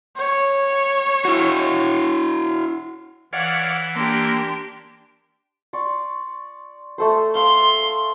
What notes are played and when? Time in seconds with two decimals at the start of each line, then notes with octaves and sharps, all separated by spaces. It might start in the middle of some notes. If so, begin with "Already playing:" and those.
0.18 C#5
1.25 E4 F#4
3.33 E3 C#5 D5 F5 F#5
3.96 A#3 D4 G4 C6
5.73 D5 C6 C#6
6.98 A3 A4 C5
7.35 F5 C6